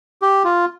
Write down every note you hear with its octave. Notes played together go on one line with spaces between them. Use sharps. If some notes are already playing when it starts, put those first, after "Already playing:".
G4
F4